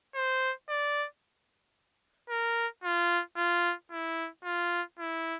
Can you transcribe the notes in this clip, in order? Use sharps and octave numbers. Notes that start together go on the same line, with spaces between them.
C5
D5
A#4
F4
F4
E4
F4
E4